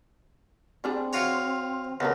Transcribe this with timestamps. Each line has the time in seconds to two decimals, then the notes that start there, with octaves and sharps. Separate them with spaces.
0.84 G3 C4 D4 G#4
1.13 F4 F#4 C#5
2.00 C#2 B3 C#4 D4 A#4